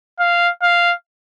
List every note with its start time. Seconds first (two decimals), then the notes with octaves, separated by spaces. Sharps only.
0.19 F5
0.62 F5